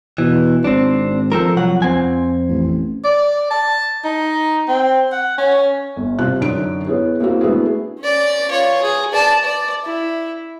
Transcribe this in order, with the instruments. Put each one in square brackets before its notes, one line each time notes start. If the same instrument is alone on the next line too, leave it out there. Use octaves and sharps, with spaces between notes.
[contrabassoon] B2 [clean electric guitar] E3
[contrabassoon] G#1 [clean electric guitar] C4 D4
[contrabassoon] F3 [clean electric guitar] C4 A4 A#4
[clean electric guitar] C2 F#3 F#5
F2 C4 G#5
[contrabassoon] A1
[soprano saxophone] D5
A5
D#4
C4
F#5
C#4
[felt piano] G1
C3 G3 F4 F#6
F#2 D3 D#4 D7
B3 E4 G#4 C#5
A#3 C4 E4 F#4
A3 B3 D4 E4 F#4 G#4
[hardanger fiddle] C#4 D5
F4 C#5
G#4
D5 A5
D5
E4